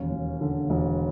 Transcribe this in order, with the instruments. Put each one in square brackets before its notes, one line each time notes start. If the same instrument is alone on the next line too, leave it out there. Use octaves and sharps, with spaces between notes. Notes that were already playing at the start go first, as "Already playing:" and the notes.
Already playing: [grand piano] E1 D#2 C#4
E1
D3
E1